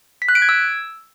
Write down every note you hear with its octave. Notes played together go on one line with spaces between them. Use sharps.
B6
F#6
D7
G#6
E6